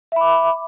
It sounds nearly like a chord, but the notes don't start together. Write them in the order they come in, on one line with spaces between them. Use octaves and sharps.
E5 B5 D6